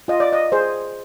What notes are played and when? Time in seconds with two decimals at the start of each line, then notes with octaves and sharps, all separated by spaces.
0.08 F4 D#5
0.20 D5
0.33 D#5
0.52 G#4 C5